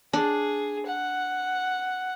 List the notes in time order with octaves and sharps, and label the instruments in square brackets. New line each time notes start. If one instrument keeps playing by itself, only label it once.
[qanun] D4 [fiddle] G#4
[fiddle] F#5